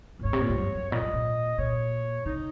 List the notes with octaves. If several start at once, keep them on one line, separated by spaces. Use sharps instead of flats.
A#2
G#2 C#5
C3
A#2
G#2
F#2
F#2
A#2 D#5
G#2
A#2
A#2 C#5
C#3 D#4